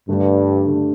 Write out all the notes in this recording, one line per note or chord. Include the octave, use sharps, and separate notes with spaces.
G2 D3 A3 D4 G4
D3 A3 D4 G4